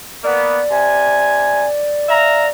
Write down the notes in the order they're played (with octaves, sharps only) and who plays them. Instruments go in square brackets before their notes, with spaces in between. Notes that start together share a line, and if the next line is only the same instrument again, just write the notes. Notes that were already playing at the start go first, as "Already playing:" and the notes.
[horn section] A#3 B3 [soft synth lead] D5
[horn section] C3 G#5
E5 F5 A#5